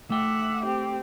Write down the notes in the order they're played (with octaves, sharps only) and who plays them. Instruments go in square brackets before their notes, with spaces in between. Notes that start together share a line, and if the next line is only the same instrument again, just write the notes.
[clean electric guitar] A3 G5 [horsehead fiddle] E5 F#5 [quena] D6
[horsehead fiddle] C4 G4